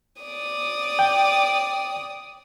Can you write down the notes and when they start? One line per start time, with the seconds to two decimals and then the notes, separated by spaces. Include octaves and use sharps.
0.22 D5 D#6
0.99 G5